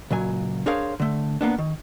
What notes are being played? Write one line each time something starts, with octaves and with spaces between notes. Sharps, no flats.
C#2 A#2 F#3 G#5
D4 G#4 A#4 C5 C#5 F5
D3 A3
A#3 B3 D4
D#3